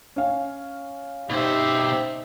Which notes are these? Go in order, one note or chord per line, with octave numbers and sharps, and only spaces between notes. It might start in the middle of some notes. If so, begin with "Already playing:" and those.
C#4 F5
B2 D#4 G4 C5 E5